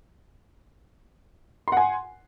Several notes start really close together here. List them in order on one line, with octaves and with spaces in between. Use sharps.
C6 F#5 G#5